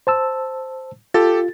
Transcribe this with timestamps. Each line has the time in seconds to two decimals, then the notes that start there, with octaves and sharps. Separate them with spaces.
0.07 C5 A5 E6
1.14 F4 G4 A4 A6